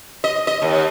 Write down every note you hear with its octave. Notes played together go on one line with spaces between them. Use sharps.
D#5
D#5
D#2